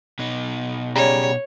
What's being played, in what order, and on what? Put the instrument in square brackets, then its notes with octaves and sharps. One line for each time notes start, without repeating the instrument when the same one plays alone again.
[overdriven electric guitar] B2 D#4
[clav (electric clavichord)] C#3 G3 A#5 [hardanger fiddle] C#5